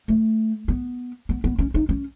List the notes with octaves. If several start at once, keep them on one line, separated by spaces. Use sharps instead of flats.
A3
B3
B3
B3
C#4
D#4
C#4